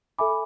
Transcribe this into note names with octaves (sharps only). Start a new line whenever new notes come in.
A4 E5 G#5 B5 D6